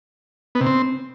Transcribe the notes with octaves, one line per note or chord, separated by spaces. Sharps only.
B3
C3
C4